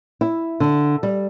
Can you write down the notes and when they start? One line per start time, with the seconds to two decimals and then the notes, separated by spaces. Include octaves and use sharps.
0.21 E4
0.60 D3
1.03 G3